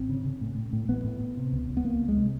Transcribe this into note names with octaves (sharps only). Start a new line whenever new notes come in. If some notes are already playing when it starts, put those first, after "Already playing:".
Already playing: G#1 C4
C#3
C#3
A2
A2
A2
A1 B3
A2
A2
C3
C#2
C#2
B3
C#2 A#3
C#2
G#3
C3